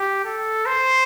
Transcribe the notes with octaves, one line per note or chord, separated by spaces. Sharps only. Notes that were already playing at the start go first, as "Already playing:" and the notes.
Already playing: G4
A4
C5